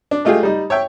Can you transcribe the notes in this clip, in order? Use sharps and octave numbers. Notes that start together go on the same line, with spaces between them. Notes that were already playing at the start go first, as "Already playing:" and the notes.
D4
G#3 A3 F4 G4 G#4
G3 D#4
C#5 E5 G5